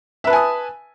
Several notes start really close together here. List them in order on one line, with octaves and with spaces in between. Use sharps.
E5 B4 A5 G#5 D#6